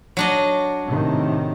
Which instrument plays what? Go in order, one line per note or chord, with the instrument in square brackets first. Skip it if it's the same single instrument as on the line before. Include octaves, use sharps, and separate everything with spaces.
[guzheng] F#3 D4 D#5
[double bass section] A2 C3 D#3